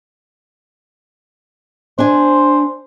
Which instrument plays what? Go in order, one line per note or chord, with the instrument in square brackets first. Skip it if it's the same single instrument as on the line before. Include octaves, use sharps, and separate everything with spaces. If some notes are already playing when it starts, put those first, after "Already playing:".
[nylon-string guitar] D4 G#5 [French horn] C5